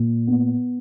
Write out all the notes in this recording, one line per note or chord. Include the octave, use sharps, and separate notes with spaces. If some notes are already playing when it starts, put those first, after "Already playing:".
Already playing: A#2
B3